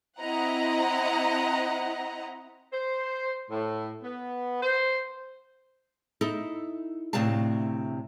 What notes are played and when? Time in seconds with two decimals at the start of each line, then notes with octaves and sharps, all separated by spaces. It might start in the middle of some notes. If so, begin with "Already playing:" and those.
0.20 C4 E4 D#5 F#5 A#5
2.73 C5
3.50 A2
4.03 B3
4.62 C5
6.21 D#4 E4 A4
7.13 D2 A2 C3 D4 F5 A5